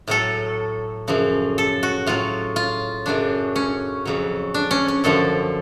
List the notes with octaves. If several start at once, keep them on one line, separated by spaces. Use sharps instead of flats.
A2 F#3 A4
F#2 C#3 F3
A4
F#4
A2 F#3 F4
F4
F#2 C#3 F#3 D4
C#4
F2 C#3 F#3
D4
C#4
C#4
F#2 D3 F3 A4